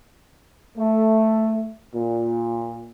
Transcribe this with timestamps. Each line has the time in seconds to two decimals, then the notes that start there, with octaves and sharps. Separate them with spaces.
0.77 A3
1.94 A#2